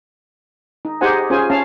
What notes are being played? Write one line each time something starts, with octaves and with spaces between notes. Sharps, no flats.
D#4
D#4 G4 G#4 C5 F#5 G#5
C#4 F4 G#4 C5 G#5
C#4 F5 A5